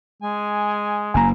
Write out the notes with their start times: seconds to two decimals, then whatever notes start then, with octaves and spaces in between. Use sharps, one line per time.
0.22 G#3 G#5
1.14 F#1 A#3 G#5 A#5